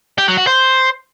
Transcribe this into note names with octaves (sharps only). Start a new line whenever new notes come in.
G4
F#3
F#4
C5